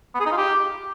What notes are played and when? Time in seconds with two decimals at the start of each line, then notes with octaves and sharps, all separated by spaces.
0.14 B3
0.20 G#4
0.26 D#4
0.32 F4
0.37 G4